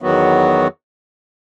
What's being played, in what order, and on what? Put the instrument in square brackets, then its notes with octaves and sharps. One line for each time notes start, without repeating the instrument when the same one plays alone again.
[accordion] E2 D#3 F#3 B3 F#4